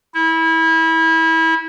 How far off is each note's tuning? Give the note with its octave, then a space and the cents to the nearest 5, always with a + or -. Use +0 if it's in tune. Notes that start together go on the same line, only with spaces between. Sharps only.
E4 -25